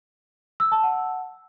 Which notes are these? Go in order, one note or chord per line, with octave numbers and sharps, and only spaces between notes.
E6
A5
F#5